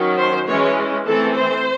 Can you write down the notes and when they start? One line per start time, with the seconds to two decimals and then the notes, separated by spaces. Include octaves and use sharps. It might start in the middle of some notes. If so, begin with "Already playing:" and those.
Already playing: D#3 F#3 C#4
0.17 C5
0.46 E3 G#3 C#4 C#5
1.06 E3 A3 C4 A4
1.35 C5